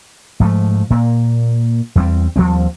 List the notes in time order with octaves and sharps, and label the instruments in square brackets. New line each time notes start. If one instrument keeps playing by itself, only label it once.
[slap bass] G#2 F3 G3 A3
A#2 A#3
E2 G3 C4
D#2 F3 G3 C4